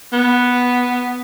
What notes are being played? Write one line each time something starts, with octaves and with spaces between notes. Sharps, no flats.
B3